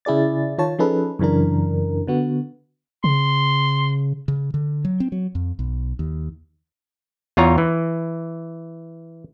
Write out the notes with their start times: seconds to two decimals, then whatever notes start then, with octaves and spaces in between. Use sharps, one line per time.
0.05 C#3 E4 G#4 D5 A6
0.58 D#3 F4 C#5 A5
0.79 F3 C#4 D#4 G#4 A4 B4
1.19 F#2 C#3 E3 D4 A#4
2.07 D3 B3 F#4
3.04 C#3 C6
4.28 C#3
4.54 D3
4.85 F#3
5.00 C4
5.12 F#3
5.35 F2
5.59 B1
5.99 D#2
7.37 E2 F4 C#5 A#5
7.58 E3